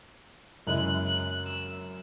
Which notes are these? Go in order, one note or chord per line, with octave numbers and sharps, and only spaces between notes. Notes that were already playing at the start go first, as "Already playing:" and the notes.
F#2 C#3 G#3 E4 F#6
F#6
E6